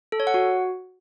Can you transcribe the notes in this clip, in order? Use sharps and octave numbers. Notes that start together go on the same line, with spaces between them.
A4
C#5
F#5
F#4